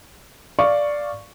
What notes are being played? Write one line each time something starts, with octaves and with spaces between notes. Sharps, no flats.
D5 F5 C#6